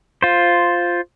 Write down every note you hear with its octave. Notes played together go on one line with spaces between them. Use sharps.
F4 C5